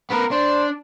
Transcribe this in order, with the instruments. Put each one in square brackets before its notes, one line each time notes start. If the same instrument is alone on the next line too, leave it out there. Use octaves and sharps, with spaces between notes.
[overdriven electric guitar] B3 A#4 [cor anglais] B4
[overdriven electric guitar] D4 [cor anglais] C5 [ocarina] D5